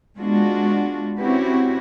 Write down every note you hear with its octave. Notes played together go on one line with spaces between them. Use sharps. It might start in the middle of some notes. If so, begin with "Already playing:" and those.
G#3 B3 D4 F4 F#4
C4 C#4 E4 F#4 G4 B4